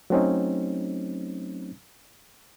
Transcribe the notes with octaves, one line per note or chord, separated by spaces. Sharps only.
F#3 A3 C4 C#4 D#4